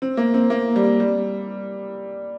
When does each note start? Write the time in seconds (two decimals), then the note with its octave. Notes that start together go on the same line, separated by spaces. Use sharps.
0.02 C4
0.17 A#3
0.34 C4
0.50 A#3
0.76 G3
1.00 G3